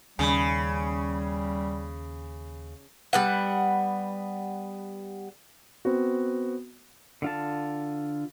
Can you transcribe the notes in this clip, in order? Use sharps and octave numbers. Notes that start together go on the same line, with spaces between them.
D#2 C#3 G3 G#5 B5
G3 B3 F#5
B3 C4 F#4
D3 F4 A5